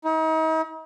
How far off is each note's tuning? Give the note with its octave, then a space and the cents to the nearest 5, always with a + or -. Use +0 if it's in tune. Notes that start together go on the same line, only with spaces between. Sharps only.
D#4 +40